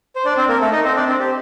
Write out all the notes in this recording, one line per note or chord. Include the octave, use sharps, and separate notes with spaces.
C5
D4 D5
C4 C5
A#3 A#4
A3 A4
D#4 D#5
C4 C5
D4 D5
C4 C5
G4